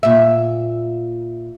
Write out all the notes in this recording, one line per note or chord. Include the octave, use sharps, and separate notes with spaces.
A#2 E5